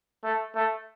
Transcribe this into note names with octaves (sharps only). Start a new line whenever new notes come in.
A3
A3